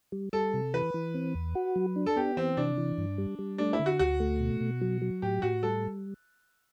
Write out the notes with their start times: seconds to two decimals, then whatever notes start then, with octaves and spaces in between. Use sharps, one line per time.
0.12 G3
0.33 G3 A4
0.54 C3
0.74 E3 B4
0.94 E3
1.14 C4
1.35 E2
1.55 F#4
1.76 F#3
1.96 D4
2.06 A4
2.16 B3 G4
2.37 E3 C4
2.57 C3 D4
2.78 E3
2.98 G2
3.18 G3
3.39 G3
3.58 A3 D4
3.73 E4
3.79 D3
3.86 F#4
3.99 D2 F#4
4.20 A3
4.40 B2
4.61 B2
4.81 F#3
5.02 F#3
5.22 A2 G4
5.42 A2 F#4
5.63 G3 A4